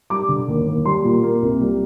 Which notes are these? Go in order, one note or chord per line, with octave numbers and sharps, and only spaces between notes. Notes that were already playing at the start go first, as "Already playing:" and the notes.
G3 D6
D3
D#2
D#2
G3 C6
A#2
A#3
C2
G3